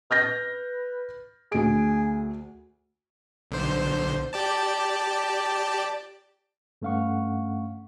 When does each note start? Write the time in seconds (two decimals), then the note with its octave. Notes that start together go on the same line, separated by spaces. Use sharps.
0.11 B4 F6 G6 A#6
1.52 D2 G#4 D7
3.51 B1 D3 C5
4.33 G4 D5 A5
6.82 G2 A3 C#4 F5 F#5 C#6